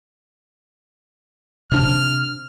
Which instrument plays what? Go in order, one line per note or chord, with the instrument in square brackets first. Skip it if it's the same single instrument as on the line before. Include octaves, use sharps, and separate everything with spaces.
[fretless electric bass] C3 D4 [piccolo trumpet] F6